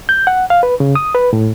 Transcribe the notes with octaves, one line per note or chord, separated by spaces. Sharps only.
G6
F#5
F5
B4
C#3
D#6
B4
A2